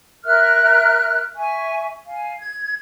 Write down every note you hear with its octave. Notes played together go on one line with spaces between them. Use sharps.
A#4 E5 F6 F#6
E5 G#5 C#6
F5 G#5
G#6